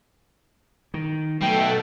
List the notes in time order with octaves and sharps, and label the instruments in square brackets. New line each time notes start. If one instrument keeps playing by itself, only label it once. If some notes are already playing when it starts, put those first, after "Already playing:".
[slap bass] D#3
[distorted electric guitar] B2 [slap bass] F#3 [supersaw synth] A3 A4 [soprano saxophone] G5